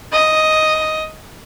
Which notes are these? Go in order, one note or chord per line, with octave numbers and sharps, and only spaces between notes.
D#5